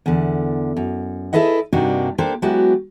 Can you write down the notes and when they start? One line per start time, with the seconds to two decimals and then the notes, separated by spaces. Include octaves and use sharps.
0.06 E2 D3
0.77 F#2
1.33 E4 G#4 A4 B4 D#5 F#5
1.73 G2 C3 A#3 D4 D#4 F#4
2.18 A#3 D4 G4 A4 C5
2.42 F#3 G#3 B3 E4 F#4 G4